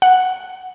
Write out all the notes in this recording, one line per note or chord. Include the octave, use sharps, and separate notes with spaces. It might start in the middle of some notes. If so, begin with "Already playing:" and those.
F#5